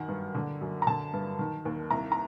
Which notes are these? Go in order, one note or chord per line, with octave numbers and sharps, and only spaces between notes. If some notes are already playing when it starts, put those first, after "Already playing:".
Already playing: F#2 D#3 F#5
G2
D3
F#2
A#5
D3 A5
G2
D#3
D#2
C2 A#5
A#5